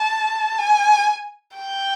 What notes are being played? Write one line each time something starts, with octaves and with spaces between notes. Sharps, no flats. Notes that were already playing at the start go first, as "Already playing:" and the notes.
Already playing: A5
G#5
G5